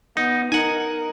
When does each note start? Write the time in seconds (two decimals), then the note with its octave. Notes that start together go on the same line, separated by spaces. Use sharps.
0.17 B3 D#4
0.52 D#4 A#4 F#5 G#5